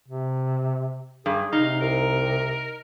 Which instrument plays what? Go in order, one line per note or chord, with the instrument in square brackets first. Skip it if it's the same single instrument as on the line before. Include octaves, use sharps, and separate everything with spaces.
[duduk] C3
[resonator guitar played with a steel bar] G2 [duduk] G#4
[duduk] C3 [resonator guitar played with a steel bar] D#4 [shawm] F5
[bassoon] C2 [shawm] A#4